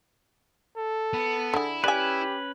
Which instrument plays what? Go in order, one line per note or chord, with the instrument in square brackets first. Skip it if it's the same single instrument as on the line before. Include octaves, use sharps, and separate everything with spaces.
[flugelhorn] A4
[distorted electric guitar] B3
[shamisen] D3 G#4 [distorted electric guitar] E4
[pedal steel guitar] C#4 B4 [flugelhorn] G4 [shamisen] D5 G#5